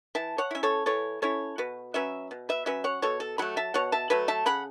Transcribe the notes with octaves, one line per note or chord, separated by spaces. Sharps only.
E3 E5 A5
C#5 F#5
C#4 E4 E5
A4 C#5
E3 A4 C#5
C#4 E4 A4 C#5
B2 F#4 B4
F#3 C#4 B4 E5
B2
B4 E5
F#3 C#4 B4 E5
C#5 F#5
B2 A4 C#5
A4
F#3 A3 F#5 B5
E5 A5
B2 C#5 F#5
E5 A5
F#3 A3 B4 E5
E5 A5
C#3 F#5 B5